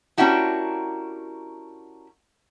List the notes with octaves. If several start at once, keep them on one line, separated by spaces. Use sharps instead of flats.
A#3 C#4 D4 E4 F#4 G4